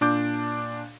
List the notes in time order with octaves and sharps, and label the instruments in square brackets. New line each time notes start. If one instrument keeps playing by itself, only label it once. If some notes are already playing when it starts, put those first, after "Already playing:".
[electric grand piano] A#2 D4 D6 G6